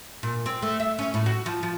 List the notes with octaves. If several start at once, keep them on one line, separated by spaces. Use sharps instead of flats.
A#2
C4
A3
E5
C#4
A2
F#4
F3
F3